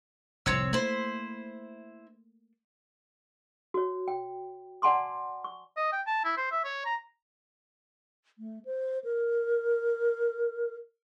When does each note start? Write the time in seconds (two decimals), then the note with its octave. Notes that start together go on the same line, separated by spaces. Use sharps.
0.46 F1 C2 A2 C4 C#5 E6
0.73 A3 A#3 E4 C5
3.74 F#4 C#5
4.08 G5
4.82 D5 F#5 G#5 A5 C6 D6
5.44 C#6
5.77 D#5
5.93 G5
6.07 A5
6.24 E4
6.37 C5
6.51 E5
6.65 C#5
6.85 A#5
8.38 A3
8.65 C5
9.04 A#4